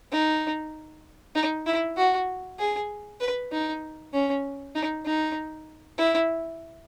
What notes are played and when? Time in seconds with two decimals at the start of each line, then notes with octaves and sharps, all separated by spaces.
0.12 D#4
1.35 D#4
1.67 E4
1.97 F#4
2.59 G#4
3.20 B4
3.52 D#4
4.13 C#4
4.75 D#4
5.06 D#4
5.98 E4